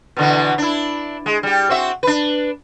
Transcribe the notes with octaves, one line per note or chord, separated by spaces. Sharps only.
B2 D3 E3
D4 E4
G#3
G3 G4
C4 F#4 E5
D4 B4